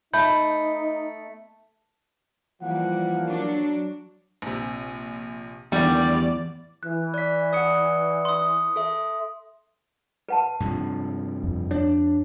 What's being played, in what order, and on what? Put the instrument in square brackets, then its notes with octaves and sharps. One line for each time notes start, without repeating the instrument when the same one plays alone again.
[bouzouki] A3 [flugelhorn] D#4 [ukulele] B5 [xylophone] G6
[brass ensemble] E3 F3 A#3 [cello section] G3 [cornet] F#5
[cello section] F#3 D4
[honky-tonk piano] A#1 C3
[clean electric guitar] E2 [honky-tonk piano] A2 D3 D#3 [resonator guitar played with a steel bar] G3 [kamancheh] D5
[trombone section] E3 [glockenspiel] F#6
[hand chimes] D5 B6 [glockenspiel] F#6
[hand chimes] D5 F#5 [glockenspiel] D#6 C#7
[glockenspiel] C6 D#6
[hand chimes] A4 E5
[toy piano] B4 F#5 A5
[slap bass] G2 C3 F3
[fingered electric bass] F2
[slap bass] D4 [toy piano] C#5